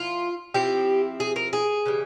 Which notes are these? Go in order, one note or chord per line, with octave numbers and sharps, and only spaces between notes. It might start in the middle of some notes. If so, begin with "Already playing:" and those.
Already playing: F3 E4 F4
F3 C4 E4 G4
G#4
A#4
G#4
C#3 E3 G3